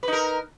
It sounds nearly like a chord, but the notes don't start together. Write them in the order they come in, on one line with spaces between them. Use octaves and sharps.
B4 D#4 A#4